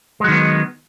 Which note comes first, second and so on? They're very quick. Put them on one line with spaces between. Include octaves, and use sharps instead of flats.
G#3 F#3 D#3 B3